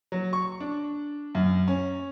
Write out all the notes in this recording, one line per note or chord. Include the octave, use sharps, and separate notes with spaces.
F#3
C#6
D4
F#2
C#4